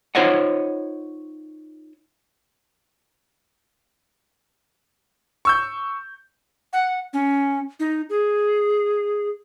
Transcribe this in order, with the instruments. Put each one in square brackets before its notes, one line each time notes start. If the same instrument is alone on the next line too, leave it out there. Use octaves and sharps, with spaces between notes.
[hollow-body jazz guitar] D#4 F4 C5 C#5 D#5 F#5
[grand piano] C#6 E6 G6
[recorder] F#5
C#4
D#4
G#4